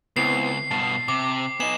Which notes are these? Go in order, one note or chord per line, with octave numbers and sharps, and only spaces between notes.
C#2 B3 C4 E4 C7
G2 B2 A5
C3 D6
B3 D#4 G#5 E7